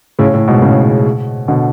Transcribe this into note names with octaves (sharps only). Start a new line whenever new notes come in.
A2 C#3
A2
G#2 B2
A2 C#3
B2 D3